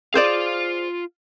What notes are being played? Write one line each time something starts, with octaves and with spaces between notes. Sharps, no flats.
F4 G#4 C5 D5 F5